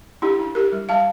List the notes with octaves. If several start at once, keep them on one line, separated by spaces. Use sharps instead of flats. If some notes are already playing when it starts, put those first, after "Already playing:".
D4 E4 G4
D4
D4 G4 A#4
G3
G3 F5 A5